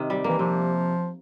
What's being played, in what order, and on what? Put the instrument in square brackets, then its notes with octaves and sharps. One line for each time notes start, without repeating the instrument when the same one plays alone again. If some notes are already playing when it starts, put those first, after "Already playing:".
Already playing: [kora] C3 D#3
G3
[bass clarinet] E3 [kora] A#3
[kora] C3 [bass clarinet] F3